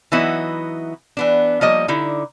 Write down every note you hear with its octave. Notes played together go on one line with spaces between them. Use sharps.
E3 F#3 B3 D#4 E4 F#4
E3 B3 D4
F3 G3 A#3 C#5 D#5
D3 D#4 E4